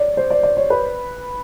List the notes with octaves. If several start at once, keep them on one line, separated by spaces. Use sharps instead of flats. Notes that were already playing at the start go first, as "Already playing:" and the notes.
Already playing: C#5 D5
C5
D5
D5
C#5
B4